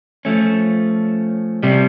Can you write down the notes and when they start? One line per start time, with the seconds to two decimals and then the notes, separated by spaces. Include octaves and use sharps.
0.25 F3 A3 C#4
1.63 C3 G3